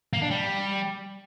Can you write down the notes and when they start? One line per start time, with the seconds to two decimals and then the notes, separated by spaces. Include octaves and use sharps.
0.13 A#3
0.22 D4
0.31 G3